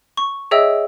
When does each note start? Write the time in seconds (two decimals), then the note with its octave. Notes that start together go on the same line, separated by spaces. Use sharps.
0.17 C#6
0.51 G#4 C#5 D#5 E5 G5 E6